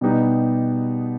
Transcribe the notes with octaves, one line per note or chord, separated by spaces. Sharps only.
B2 G3 B3 D#4 G4